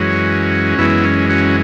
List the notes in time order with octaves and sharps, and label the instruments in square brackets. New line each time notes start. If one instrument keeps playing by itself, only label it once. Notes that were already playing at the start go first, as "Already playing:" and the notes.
Already playing: [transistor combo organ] F#2 E3 G#3 C#4 F#4
F#2 E3 G#3 B3 E4
C#4
C#4 F#4